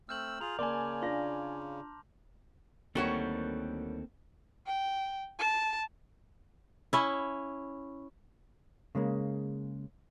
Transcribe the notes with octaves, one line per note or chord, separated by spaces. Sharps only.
A3 C4 E6 F6 G6 F#7
F4 G#4 A#5 F7
C#3 A#3 D5 G#5 A5 C6 D6
D4 F4 C6 A#6
D2 D#3 G3 A#3 C4 F#4 A4 C#5
G5
A5
C#4 E4
C#3 G#3 A#3